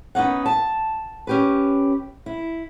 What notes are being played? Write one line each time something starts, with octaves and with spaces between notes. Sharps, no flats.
B3 C#4 D#4 F#5
A5
C#4 G4 B4
E4